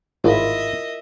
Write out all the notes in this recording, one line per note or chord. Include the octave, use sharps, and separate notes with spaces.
G#1 A2 E4 F4 A#4 D#5 E5